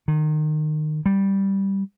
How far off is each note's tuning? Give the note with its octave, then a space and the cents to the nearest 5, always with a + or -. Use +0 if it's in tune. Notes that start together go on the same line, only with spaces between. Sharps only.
D#3 -25
G3 -5